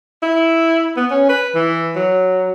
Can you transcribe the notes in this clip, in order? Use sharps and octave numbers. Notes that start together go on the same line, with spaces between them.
E4
B3
C#4
B4
E3
F#3